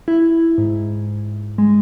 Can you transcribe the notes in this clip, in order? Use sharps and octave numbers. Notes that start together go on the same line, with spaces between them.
E4
G#2
G#3